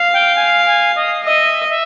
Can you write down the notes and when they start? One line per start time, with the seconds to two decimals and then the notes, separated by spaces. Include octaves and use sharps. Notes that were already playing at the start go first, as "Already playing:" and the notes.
Already playing: F5
0.13 G5
0.35 G#5
0.65 G#5
0.95 D#5
1.24 D#5 E5
1.68 E5